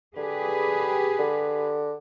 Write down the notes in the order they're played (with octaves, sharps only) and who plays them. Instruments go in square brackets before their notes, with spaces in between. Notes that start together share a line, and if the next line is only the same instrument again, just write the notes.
[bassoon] D3 [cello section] G4 G#4 B4
[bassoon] D3